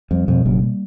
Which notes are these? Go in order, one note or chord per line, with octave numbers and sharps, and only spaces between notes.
F2 G3
F2 B2
F#1 F#2 A#3
G3